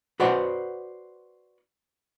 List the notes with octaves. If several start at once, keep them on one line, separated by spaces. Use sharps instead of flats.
F#4 B4 C5 D5 F#5